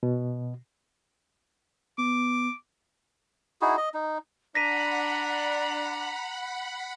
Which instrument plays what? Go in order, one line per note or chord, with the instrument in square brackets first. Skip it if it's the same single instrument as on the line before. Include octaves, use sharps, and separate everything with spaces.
[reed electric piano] B2
[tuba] B3 [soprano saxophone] D6
[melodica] D#4 E4 F#4 G#4
D#5
D#4
[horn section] D4 [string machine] F#5 B5 [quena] A#5 [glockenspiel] A#6 B6 D#7